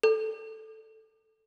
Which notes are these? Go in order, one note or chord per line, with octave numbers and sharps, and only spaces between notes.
A4